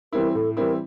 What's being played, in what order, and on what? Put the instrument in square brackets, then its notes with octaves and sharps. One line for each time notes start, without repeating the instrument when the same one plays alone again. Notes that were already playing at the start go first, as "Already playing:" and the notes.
[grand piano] E3 G3 C4 E4 [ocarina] A#4
[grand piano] A2 [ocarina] A4
[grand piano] E3 G3 C4 E4 [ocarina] A#4